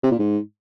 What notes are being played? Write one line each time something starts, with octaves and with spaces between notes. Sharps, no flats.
C3
A#2
G#2